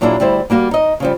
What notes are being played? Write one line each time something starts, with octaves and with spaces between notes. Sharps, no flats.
A#2 F#3 A#3 D4 E4 G#4
D2 G3 E4 C5
G3 A#3 F#4 F5
D#4 D#5
C#3 F3 G3